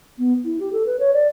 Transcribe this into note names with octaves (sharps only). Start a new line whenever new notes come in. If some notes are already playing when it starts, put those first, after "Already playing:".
B3
E4
G4
A4
B4
C#5
D5